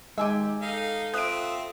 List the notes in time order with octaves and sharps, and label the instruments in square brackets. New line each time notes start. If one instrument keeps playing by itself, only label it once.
[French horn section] D#2 D#4 [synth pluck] G#3 [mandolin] G4 G#5 E6
[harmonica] D#4 F5 [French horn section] A4
[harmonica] C4 F4 E5 [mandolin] D#6 [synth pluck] F#6 D7